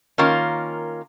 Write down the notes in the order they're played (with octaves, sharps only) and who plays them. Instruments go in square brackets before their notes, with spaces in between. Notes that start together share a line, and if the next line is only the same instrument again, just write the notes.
[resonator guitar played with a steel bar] D#3 A#3 C#4 F4 A#4